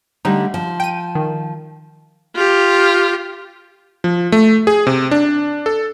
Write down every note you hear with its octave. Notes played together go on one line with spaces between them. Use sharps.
D3 G3 A3 D#4
F3
G5 D#7
D#3
F4 G4
F3
A3
G#4
C3
D4
A4